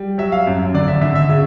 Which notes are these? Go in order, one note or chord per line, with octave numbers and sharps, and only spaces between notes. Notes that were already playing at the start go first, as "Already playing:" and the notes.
Already playing: G3
F#3 E5
F5
F#2
D3 D5
E5
D3 E5
E5
C#3 E5